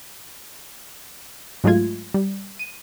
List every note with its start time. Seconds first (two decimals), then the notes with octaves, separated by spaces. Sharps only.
1.64 G#2 F#3 G#3 A3 F4 G#6
2.14 G3
2.59 D#7